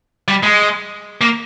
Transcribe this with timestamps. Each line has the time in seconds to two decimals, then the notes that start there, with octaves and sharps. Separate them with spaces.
0.28 G3
0.43 G#3
1.21 A#3